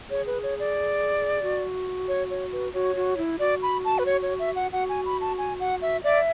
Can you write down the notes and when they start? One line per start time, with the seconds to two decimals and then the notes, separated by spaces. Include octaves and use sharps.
0.10 G#4 C#5
0.27 B4
0.43 C#5
0.59 D5
1.42 F#4
2.08 C#5
2.30 C#5
2.52 B4
2.74 F#4 C#5
2.96 F#4
3.18 E4
3.39 F#4 D5
3.62 B5
3.85 A5
3.99 B4
4.06 C#5
4.22 C#5
4.39 E5
4.56 F#5
4.72 F#4 F#5
4.89 G#5
5.06 B5
5.21 A5
5.38 G#5
5.60 F#5
5.82 E5
6.03 D5 E5